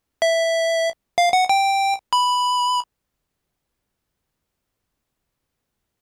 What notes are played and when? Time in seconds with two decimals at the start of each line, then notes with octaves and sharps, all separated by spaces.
0.22 E5
1.18 F5
1.33 F#5
1.49 G5
2.13 B5